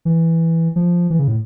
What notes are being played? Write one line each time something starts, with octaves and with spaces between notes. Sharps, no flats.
E3
F3
E3
C#3
A2